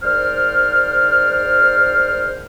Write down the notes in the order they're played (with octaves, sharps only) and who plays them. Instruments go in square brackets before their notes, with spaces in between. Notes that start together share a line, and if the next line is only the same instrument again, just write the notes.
[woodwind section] G#2 A#4 C5 D5 F6